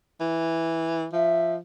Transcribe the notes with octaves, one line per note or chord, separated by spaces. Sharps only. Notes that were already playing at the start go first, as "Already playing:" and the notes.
E3
F3 E5